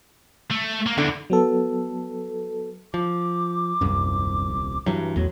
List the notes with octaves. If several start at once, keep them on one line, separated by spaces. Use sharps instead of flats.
A3
A#3
E2 D3
F#3 B3 A4
F3 D6
D#1 C2 F#2
G2 E3 F#3 A#5
A1 E2 F#3 C#5